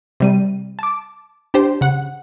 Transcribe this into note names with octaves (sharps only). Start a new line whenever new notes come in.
C3 G3 D#7
A5 D6
D4 G4 C5
C#3 F#5